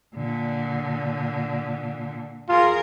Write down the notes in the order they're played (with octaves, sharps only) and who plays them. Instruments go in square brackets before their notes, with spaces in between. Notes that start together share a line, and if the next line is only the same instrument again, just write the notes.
[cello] A#2 D3
[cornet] F4 [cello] G#4 A#4